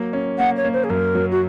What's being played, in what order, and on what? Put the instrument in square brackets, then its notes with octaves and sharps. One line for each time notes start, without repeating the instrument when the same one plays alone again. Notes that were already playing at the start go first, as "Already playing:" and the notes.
Already playing: [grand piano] F#3 A#3
C#4
[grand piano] A#3 [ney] F#5
[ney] C#5
[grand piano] A#3
[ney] C5
G#4
[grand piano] F#2 [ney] A#4
[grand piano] F#3
[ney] F#4